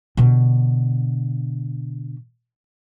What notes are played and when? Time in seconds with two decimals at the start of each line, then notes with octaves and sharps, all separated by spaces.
0.17 B2 D3